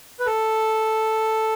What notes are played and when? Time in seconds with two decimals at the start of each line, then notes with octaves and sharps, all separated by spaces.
0.20 B4
0.26 A4